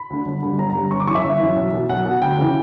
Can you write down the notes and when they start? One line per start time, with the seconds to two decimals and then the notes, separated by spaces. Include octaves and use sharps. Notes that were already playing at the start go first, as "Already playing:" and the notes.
Already playing: B5
0.10 D2 D3
0.26 G1
0.43 G2 D3
0.58 G1 A#5
0.70 A#5
0.75 G2 D3
0.91 G1 C#6
1.00 D6
1.07 F#2 E3 C#6
1.15 E5
1.23 G1
1.40 F#2 E3
1.56 B1
1.73 B2
1.89 B1 F#5
2.05 B2
2.22 D2 G5
2.38 C#3 E3